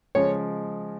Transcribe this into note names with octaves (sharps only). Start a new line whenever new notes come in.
C#3 F3 G#3 C#5